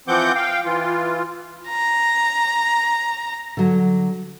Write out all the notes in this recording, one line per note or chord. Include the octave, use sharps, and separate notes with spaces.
E3 F3 C4 F#5 D6 G6
F5 G5
E3 F4
A#5
D3 F#3